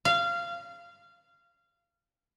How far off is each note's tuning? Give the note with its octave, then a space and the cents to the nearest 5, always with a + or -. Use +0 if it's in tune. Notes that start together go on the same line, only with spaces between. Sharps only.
F5 -20